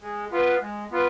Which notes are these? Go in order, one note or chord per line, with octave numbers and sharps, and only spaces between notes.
G#3
B3 F4 B4
G#3
B3 F4 B4